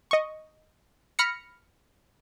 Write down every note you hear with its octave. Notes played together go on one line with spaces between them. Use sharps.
D#5 C#6
B5 F6 A#6 C#7